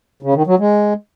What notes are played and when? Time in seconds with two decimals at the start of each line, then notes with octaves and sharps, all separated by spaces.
0.23 C#3
0.34 D#3
0.47 F#3
0.59 G#3